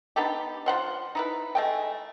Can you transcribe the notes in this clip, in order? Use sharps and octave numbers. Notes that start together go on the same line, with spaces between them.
B3 D4 D#4 G4
F3 C5 F#5 C6
D#4 E4 B4
G#3 A3 G5